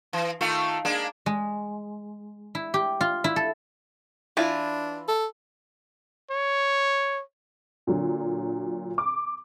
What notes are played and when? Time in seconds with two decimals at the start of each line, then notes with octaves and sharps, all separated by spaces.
0.13 E3
0.41 D#3 A3 F4
0.85 G#3 A#3 D4
1.26 G#3
2.55 E4
2.74 G4
3.01 F4
3.24 E4
3.36 A4
4.37 E3 D4 E4 F4
5.08 A4
6.31 C#5
7.87 A#2 D3 F#3
8.98 D6